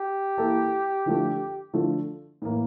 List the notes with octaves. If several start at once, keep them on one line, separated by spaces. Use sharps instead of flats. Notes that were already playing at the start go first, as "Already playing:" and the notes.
Already playing: G4
E3 A#3 E4 A4
D3 F3 A3
D3 F3 A3
A2 E3 A#3